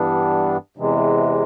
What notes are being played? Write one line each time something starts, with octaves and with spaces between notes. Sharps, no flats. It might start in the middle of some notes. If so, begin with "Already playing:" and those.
Already playing: G2 E3 G3 B3 D4
E2 C3 E3 G#3